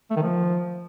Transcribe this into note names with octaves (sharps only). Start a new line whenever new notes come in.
A3
D#3
F3